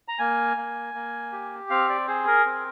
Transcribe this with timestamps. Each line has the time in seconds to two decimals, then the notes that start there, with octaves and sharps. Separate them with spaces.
0.08 A#5
0.19 A#3 G#5
0.57 A#3
0.94 A#3
1.32 G4
1.70 C4 F5
1.89 D5
2.08 G#4 C5
2.27 A#4
2.46 C4